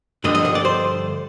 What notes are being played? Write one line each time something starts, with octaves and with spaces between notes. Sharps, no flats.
G2 D3 F3 D#5
D#5
D#5
D5
C5